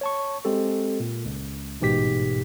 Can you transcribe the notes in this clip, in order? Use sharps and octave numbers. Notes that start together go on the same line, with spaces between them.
C#5 A5 C#6
G#3 C4 G4 A4
A#2
C#2
A1 G#2 B2 G4 B6